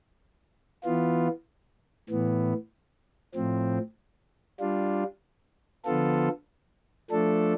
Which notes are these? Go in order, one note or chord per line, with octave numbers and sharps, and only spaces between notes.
E3 B3 F4
A2 E3 B3
A2 F3 C4
G3 D4 F4
D3 F3 B3 F4 A4
F3 A3 D4 A4